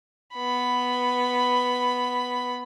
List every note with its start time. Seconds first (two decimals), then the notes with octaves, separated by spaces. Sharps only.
0.34 B3 B5